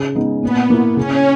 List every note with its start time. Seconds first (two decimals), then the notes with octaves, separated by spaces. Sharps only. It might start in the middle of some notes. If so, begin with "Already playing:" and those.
Already playing: C#3
0.15 G#3 B3 D#4
0.43 A#2 B3
0.70 A#3 E4
0.97 C#3 C#4